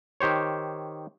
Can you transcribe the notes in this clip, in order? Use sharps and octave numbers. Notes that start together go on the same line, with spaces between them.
D#3 G4 C5 C#5